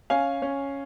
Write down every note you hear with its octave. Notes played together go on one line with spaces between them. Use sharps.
C#4 F5 G#5
C#4